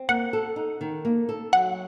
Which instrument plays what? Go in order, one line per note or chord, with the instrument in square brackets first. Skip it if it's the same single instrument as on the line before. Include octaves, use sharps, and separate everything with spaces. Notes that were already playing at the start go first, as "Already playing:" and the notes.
Already playing: [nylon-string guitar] C4
[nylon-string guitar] A#3 [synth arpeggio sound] F#5
[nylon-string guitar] A4
D#4
D#3
A#3
A4
[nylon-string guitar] F#3 [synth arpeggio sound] F#5